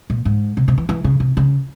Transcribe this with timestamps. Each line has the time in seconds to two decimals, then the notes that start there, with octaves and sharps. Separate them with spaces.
0.10 A#2
0.25 G#2
0.57 C3
0.68 C3
0.78 E3
0.89 E3
1.04 C#3
1.20 C3
1.37 C#3